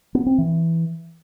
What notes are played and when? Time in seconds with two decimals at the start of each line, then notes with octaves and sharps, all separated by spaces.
0.15 B3
0.26 C4
0.38 E3